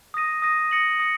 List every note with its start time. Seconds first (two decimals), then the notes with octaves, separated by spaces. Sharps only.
0.14 D#6 A#6 D#7
0.42 D#6 A#6 D#7
0.71 D#6 A#6 C#7 F#7
1.00 D#6 A#6 C#7